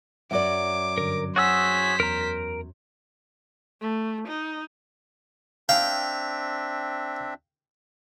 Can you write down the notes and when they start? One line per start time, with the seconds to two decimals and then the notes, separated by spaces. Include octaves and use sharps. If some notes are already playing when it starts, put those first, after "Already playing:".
0.31 F#2 F#3 D5 E5 F#5 D6
0.98 G2 D3 A#4
1.36 F#4 G#4 C5 C#5 F#5 G#5 E6 B6
2.00 E2 A#4 A#5
3.81 A3
4.28 D#4
5.69 C4 D4 E5 F5 G5